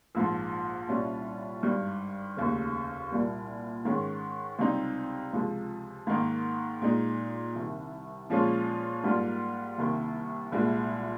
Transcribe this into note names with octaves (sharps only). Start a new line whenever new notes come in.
A#1 G#2 F3
C2 A#2 G3 C#4 F4
G#1 G2 G3
F1 D#2 C#3
C2 A#2 G3 A#3
G#2 D#3 G#3 C#4
C#2 C3 G3 C4 D#4
C#2 C3 F3 G#3
G#2 D#3 A#3 D#4
A#2 G#3 D#4
C2 C3 D#3
A#2 F3 G#3 C#4 F4
G#2 G3 A#3 F4
C2 C3 D#3 A#3
C2 A#2 G#3